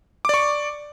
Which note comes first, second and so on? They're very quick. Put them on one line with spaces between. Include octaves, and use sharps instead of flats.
D6 D5 C#6